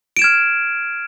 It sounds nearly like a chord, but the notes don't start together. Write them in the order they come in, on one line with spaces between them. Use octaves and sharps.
D7 E7 G#6 F6